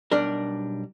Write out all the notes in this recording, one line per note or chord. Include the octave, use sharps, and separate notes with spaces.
B1 G3 D4 A#4